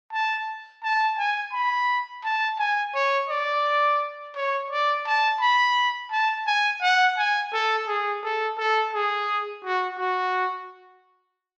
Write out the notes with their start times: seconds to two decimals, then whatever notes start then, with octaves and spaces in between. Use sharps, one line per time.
0.13 A5
0.83 A5
1.18 G#5
1.53 B5
2.24 A5
2.59 G#5
2.95 C#5
3.29 D5
4.35 C#5
4.70 D5
5.06 A5
5.40 B5
6.11 A5
6.47 G#5
6.82 F#5
7.17 G#5
7.52 A4
7.87 G#4
8.23 A4
8.58 A4
8.93 G#4
9.64 F#4
9.98 F#4